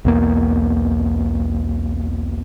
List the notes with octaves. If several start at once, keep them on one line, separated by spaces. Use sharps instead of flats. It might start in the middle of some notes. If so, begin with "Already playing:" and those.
B1 E2 A#3